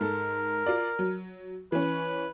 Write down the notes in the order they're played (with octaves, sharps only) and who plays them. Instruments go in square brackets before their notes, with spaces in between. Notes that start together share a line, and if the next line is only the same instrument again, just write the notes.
[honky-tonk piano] G#2 A4 [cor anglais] A#4
[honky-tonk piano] F4 D5
F#3
[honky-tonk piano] E3 C#4 [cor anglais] B4